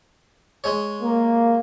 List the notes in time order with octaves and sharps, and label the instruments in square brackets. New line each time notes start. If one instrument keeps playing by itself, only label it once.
[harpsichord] G#3 C#5
[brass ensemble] A#3